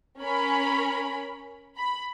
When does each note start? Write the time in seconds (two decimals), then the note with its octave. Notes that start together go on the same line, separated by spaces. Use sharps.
0.20 C#4 A#4 B5
1.77 B5